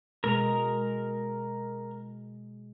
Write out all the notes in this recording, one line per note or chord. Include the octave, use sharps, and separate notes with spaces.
B2 G#3 A#4 A#5